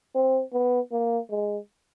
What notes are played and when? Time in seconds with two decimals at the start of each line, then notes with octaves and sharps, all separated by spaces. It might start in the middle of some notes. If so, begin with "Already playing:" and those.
0.15 C4
0.53 B3
0.92 A#3
1.31 G#3